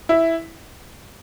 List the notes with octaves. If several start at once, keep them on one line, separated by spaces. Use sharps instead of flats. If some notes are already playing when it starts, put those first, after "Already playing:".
E4